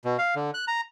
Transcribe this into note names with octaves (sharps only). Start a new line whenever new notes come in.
B2
F5
D3
F#6
A#5